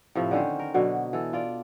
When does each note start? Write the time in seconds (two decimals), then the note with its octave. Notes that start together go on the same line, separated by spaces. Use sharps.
0.15 A2 C3 F3
0.31 D3 D#3 C#4 C5
0.59 A#4
0.74 B2 D3 F#3
1.13 E3 A4
1.33 F4 D5